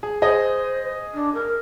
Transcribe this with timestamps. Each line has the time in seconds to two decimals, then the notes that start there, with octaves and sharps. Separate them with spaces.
0.03 G#4
0.22 G#4 C5 D#5
1.14 D4
1.33 A#4